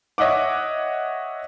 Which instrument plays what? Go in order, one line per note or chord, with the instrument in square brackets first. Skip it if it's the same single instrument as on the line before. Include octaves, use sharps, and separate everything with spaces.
[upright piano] C#5 D#5 E5 F#5 D6